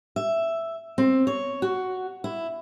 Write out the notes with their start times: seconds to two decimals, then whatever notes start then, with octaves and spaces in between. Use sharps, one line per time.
0.16 E5
0.98 C4
1.27 C#5
1.62 F#4
2.24 E4